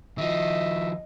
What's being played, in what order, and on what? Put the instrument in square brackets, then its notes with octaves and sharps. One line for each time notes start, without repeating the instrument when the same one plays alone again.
[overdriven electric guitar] D#3 F3 [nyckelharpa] D#5 [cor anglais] E5